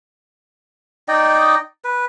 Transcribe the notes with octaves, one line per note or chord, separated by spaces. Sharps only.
D#4 D5 D#5 G5
B4